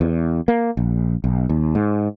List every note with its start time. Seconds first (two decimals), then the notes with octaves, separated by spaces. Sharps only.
0.01 E2
0.48 A#3
0.77 A#1
1.24 B1
1.49 D#2
1.75 G#2